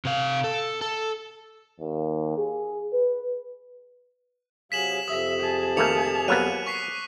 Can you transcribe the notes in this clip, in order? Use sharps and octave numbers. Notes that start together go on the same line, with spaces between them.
C3 F5
A4
A4
D#2
G#4
B4
C3 F#3 G#4 F5 B6 E7 F#7
F2 C3 E5 D#6
G#4 A5
D#3 A3 A#3 D6 C#7 F7
F#3 A#3 B3 F#6 D#7
C#6 B6 C7